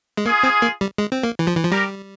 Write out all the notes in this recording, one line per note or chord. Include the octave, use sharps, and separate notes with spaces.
G#3
A#3 F4 G#4
C4
A#3
G3
G#3
C4
A#3
E3
F3
E3
F3
G3 G4 A#4